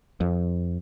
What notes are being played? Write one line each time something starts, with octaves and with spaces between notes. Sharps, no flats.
F2